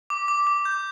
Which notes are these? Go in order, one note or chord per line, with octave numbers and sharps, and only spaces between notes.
D6
D6
D6
G6